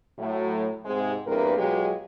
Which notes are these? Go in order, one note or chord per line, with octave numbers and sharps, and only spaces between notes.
A2 F#3
G#2 C3 G#3
E2 G2 C3 A#3 A#4 B4
B2 F#3 G#3 F4 G4 G#4